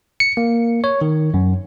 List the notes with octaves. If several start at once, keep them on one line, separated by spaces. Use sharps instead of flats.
C#7
A#3
C#5
D#3
F#2